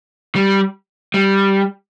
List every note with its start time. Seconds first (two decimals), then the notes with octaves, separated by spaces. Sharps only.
0.35 G3
1.14 G3